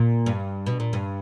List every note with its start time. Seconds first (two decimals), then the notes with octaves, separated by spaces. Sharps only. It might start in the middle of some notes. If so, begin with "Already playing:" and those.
Already playing: A#2
0.26 G2
0.66 B2
0.80 A#2
0.93 G2